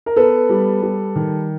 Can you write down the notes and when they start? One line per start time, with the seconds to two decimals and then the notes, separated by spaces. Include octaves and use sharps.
0.06 A#4
0.16 B3 A4 B4
0.49 G3
0.82 G3
1.16 D#3